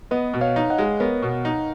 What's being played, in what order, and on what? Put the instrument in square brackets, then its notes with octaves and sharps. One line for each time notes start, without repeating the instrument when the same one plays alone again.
[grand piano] B3 [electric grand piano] B4 D#5
[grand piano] B2
[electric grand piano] C#5 F5
[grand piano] D#4
[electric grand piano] D#5 F#5
[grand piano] G#3
[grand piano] B3 [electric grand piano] A#4 C#5
[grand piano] B2
D#4